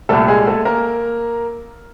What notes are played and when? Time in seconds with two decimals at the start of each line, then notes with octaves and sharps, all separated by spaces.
0.09 C2 A#2 G3 A3 A4
0.28 G#3 G#4
0.47 A3 A4
0.65 A#3 A#4